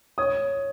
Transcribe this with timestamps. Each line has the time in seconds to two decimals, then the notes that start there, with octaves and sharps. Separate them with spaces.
0.18 C#5 D#6